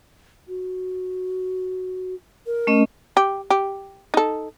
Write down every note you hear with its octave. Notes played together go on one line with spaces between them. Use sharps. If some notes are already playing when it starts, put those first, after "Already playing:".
F#4
A#4
A3 C#4 D#5
G4
G4
D#4 A4